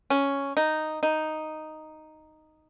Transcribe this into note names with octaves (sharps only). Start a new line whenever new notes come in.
C#4
D#4
D#4